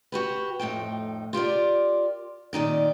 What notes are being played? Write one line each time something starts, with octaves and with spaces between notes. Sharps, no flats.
F#4 G4 B4
F2 A2 D#4 G5
F4 G4 A#4 D5
A#2 D#3 D#4 D5